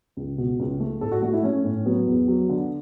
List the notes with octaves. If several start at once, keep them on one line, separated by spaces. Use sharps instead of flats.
C#2
B2
C#2
A3
A2 A4
F#4
A3 F#4
E4
A3 C#4
A2
F#3 B3
E2
F#3
D3